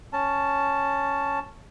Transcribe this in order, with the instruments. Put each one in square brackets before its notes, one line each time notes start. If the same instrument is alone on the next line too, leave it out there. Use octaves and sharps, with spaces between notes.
[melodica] C#4 A5